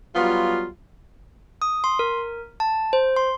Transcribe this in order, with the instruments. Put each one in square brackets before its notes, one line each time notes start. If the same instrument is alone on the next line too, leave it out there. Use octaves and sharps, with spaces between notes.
[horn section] F#3 G3 B3 F4
[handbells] D#6
C6
A#4
A5
C5
C6